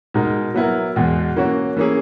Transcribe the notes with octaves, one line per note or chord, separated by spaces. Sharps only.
B2 G#3 D#4 A#4
F#3 B3 E4 A#4
E2 B2 G#3
E3 A#3 C#4 F#4
E3 A#3 C#4 G#4